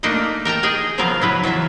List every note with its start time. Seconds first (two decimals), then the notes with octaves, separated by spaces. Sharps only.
0.03 A3 A#3 D4 D#4 D#5
0.45 A#4 G5 A5 A#5
0.63 G#4 D#5 G5 G#5
0.98 C#3 F3 F#3 B3 A#4 F5
1.21 F#3 E4 B4
1.44 E3 F#3 F4 E5